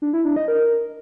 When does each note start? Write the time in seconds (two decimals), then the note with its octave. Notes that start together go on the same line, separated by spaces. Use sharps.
0.02 D4
0.13 E4
0.25 D4
0.36 D#5
0.48 A#4